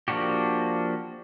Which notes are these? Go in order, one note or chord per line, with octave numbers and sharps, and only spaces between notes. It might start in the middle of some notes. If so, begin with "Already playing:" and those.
F3 A#3 D4 F#4 G4